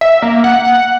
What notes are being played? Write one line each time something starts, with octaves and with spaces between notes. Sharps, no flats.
E5
A#3
F#5
F#5